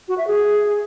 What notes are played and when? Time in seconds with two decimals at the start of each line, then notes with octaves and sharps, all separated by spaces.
0.08 F#4
0.18 E5
0.27 G#4